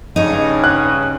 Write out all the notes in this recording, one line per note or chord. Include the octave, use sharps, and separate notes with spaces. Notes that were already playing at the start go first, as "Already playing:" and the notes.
G2 C#3 D#4 C#5
F#6